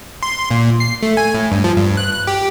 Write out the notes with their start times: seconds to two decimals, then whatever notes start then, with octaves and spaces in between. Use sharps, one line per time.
0.23 C6
0.51 A#2
0.80 C7
1.03 A3
1.17 G#5
1.34 A2
1.52 G2
1.64 F3
1.77 G2
1.97 F#6
2.12 F#6
2.27 G4